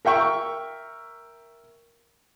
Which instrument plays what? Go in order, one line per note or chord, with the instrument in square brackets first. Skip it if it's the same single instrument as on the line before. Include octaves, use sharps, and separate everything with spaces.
[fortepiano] A#4 E5 G5 C#6